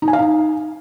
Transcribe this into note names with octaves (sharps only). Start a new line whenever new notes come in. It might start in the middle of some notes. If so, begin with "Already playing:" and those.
D#4
G#5
F5
D#4